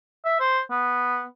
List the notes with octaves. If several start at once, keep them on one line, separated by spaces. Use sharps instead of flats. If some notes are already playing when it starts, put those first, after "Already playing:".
E5
C5
B3